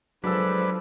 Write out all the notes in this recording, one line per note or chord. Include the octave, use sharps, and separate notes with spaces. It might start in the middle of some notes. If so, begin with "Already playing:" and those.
F3 F#3 G#3 D4 A4 B4 E6